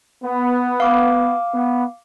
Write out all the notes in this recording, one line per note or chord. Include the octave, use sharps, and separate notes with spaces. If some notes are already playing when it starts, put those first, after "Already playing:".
B3
F5 D6
B3